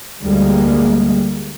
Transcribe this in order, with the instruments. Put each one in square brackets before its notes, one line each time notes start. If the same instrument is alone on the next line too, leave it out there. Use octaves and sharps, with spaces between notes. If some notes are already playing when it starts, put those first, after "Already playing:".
[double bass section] D2 G3 G#3 A#3